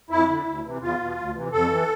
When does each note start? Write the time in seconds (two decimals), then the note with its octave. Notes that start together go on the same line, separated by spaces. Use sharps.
0.10 F2 E4
0.28 D3
0.46 D2
0.64 C3 E3
0.81 E2 F4
0.99 B2
1.17 D2
1.34 C3 E3
1.52 F2 A4
1.70 E3